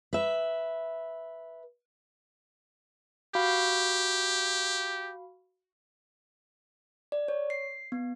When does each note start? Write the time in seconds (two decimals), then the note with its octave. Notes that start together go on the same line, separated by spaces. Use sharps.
0.13 B4 E5
3.35 F#4 G4 F5 B5
7.12 D5
7.28 C#5
7.50 C7
7.92 B3